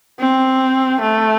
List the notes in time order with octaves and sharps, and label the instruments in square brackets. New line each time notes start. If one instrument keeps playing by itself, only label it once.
[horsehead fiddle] C4
A3